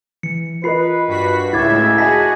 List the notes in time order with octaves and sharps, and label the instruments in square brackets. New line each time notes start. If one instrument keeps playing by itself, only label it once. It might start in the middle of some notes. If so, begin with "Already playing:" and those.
[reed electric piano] E3 [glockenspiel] C#7
[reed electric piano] F4 A#4 D#5 [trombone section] B4 [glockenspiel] B5 C7
[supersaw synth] G2 F#4 B6
[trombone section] C#2 [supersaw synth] A2 E5 [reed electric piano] E4 [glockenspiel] D6 G#6 A6
[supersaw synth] F#4 G#4 [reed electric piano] D#5 G#5 A5 [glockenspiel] A#6 B6